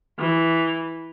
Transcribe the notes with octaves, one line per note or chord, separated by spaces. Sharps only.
E3